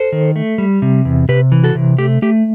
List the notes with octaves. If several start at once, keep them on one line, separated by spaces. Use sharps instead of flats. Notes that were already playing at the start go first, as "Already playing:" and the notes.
Already playing: A4 C5
D#3
A3
G3
C3
E2
C3 G4 B4
E3
F#4 A4
C3
A3 G4
A3 G4